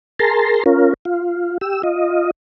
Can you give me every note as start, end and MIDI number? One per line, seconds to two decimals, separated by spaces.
0.19 0.63 68
0.19 0.63 70
0.19 0.63 81
0.19 0.63 82
0.19 0.63 84
0.66 0.94 61
0.66 0.94 65
0.66 0.94 70
1.05 1.58 65
1.61 1.82 67
1.61 1.82 88
1.83 2.31 65
1.83 2.31 75